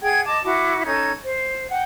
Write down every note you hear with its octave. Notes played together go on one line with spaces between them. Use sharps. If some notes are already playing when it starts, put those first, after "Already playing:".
G#4 F#5 G5 G#6
D#5 A5 D6
E4 F#4 D6
C#4 D#4 A4 G#6
C5
F#5 G5